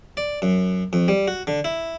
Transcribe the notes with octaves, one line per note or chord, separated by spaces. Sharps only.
D5
F#2
F2
G3
F#4
D3
E4